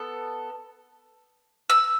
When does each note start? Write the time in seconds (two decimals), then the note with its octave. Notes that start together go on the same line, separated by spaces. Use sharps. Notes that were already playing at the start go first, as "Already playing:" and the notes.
Already playing: B3 A4
1.70 E6